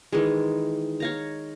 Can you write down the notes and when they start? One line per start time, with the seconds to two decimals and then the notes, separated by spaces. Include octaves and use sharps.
0.13 D#3 E3 G#3
1.00 C#5 F5 A#5